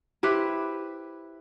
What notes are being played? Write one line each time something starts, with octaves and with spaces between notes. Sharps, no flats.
E4 G4 B4 C5